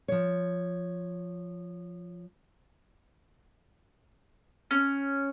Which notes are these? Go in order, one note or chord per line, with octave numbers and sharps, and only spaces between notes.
F3 C#5
C#4